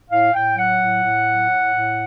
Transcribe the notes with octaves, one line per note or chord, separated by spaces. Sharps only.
A2 F5
A2 G5
F#3 F#5
A2
A2
F#3
A2
A2